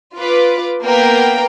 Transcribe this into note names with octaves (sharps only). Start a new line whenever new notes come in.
F4 B4 D6
A#3 B3 A#4 G5